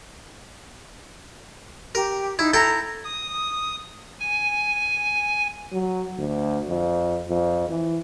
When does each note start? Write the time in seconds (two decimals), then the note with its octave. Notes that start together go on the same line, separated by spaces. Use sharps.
1.95 G4 A#4
2.39 D#4 E4
2.53 E4 A4 G5 A#5
3.04 D#6
4.20 G#5
5.72 F#3
6.18 D2
6.69 F2
7.28 F2
7.69 E3